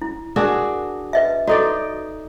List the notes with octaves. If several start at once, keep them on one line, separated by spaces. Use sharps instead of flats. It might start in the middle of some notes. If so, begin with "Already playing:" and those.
E4
D4 F#4 G#4 A#4
B4 D#5 E5
D#4 F#4 A4 D5